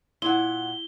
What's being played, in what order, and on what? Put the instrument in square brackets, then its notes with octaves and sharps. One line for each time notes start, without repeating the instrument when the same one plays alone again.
[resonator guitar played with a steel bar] A#2 F#5 [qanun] E4 [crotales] G7